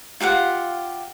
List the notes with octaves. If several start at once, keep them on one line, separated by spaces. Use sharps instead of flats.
F4 G4 F5 F#5